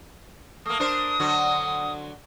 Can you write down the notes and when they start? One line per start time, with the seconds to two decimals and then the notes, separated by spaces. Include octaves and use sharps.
0.66 A3 A#3 D#6
0.80 D4 A#4 C5
1.20 D3 F#3 F#4